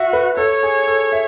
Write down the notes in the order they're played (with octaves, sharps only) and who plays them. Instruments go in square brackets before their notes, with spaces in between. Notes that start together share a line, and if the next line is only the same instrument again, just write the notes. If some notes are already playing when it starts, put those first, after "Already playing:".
Already playing: [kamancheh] F#4 [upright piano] E5
[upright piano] B4
[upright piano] A4 [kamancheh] C#5
[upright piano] G#4
A4
E5